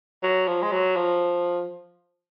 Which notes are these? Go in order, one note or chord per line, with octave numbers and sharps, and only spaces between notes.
F#3
F3
G#3
F#3
F3